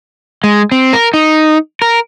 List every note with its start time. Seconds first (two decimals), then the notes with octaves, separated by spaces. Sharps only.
0.44 G#3
0.72 C4
0.93 A#4
1.14 D#4
1.82 A#4